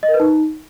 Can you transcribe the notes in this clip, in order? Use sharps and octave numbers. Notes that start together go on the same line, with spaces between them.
D#5
A#4
B4
D#4